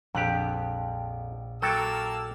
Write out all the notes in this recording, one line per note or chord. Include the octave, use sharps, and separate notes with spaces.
A#1 F2 G4 F#6
F#3 A#3 A4 G5 A5 D6 E6